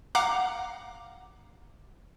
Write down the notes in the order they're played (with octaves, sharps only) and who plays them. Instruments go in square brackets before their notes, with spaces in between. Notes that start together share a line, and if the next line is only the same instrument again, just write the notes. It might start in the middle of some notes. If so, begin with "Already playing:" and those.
[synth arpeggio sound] F5 F#5 A#5 D6